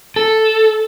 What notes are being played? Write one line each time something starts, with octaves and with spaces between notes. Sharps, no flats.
A4